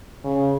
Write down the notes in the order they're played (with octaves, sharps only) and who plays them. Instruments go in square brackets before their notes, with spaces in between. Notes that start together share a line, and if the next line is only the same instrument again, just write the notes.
[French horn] C#3